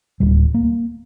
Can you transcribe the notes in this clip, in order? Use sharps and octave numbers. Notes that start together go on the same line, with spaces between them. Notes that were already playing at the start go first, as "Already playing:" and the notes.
D1 G3
A#3